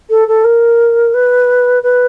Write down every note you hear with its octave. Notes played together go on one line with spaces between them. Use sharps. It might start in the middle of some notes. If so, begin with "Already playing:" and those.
A4
A4
A#4
B4
B4